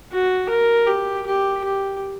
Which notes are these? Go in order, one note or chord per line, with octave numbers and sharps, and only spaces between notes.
F#4
A#4
G4
G4
G4